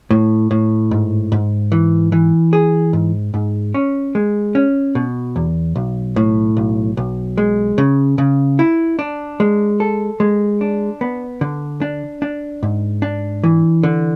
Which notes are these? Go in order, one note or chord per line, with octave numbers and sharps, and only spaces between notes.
A2
A2
G#2
G#2
E3
E3
G#4
G#2
G#2
C#4
G#3
C#4
B2
E2
B1
A2
B1
B1
G#3
C#3
C#3
E4
D4
G#3
A4
G#3
D4
B3
D3
D4
D4
G#2
D4
E3
D3